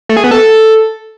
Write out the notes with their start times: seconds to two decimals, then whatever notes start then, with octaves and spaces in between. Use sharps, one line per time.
0.09 A3
0.17 G#4
0.24 B3
0.31 A4